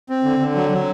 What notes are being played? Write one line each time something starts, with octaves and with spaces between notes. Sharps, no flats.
C4
D3
D3
F#3
F#3